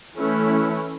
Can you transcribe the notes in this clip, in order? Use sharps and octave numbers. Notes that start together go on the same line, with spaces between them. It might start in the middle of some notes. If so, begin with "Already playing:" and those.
E3 A3 C#4 E4